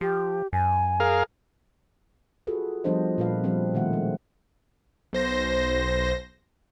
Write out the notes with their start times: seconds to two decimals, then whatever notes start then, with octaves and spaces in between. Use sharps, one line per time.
0.01 F3 G4
0.53 F#2 G#5
1.00 G#4 A#4 F5
2.47 F4 F#4 G#4 A4 B4
2.84 F3 G3 B3 D4 C5 D#5
3.18 A#2 A#3 B4 F5
3.44 F3 G3 C4
3.74 B2 D#3 A3 F#5
3.93 G#3
5.13 B1 C5 A#6